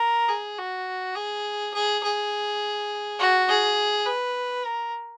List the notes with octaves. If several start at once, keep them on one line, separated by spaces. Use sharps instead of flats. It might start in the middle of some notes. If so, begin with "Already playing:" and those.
Already playing: A#4
G#4
F#4
G#4
G#4
G#4
F#4
G#4
B4
A#4